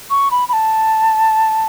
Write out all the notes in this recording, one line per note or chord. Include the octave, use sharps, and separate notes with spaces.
C#6
B5
B5
A5